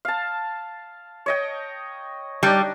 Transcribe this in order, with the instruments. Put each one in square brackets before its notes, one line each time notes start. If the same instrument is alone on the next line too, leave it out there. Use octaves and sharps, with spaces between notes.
[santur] F5 A5
C#5 D#5 G5
[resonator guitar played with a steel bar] G3 [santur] D4 D#4